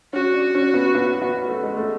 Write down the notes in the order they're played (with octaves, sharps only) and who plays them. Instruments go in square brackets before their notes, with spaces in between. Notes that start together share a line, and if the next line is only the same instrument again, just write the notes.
[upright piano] C#4 [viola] F#4
[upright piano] D4
C#4
B3
B3
B3
A3
G#3
A3